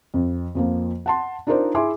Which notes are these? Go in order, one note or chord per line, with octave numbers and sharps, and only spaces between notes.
F2
F2 F3 A#3
F#5 A5 C6
D4 D#4 F4 A#4 C5 D5
E4 G#4 E5 G#5 C6 D6